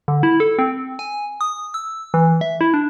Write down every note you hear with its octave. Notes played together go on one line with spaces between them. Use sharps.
D3
E4
A4
C4
G#5
D#6
E6
E3
E5
E4
D4